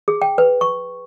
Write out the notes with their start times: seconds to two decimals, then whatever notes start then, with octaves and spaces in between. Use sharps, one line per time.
0.08 G#4
0.22 G5
0.38 B4
0.61 C#6